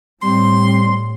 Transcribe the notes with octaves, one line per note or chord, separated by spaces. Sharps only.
A2 G3 C4 C6